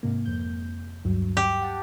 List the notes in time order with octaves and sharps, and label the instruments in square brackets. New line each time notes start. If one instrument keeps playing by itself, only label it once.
[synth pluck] G#2 C3 A#3
F2 G6
D2 G2 F#3
[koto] G4
[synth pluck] F#5 A5